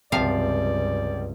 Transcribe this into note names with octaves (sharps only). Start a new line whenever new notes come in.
C#2 G2 C3 F3 D5 F5